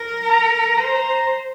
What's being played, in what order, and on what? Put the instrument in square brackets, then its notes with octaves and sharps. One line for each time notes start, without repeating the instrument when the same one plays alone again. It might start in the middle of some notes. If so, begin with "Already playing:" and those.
Already playing: [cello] A#4
[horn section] A#5
[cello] C5 [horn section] A#5